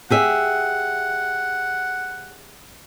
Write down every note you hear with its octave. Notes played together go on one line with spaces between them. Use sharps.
G4 G#4 E5 F#5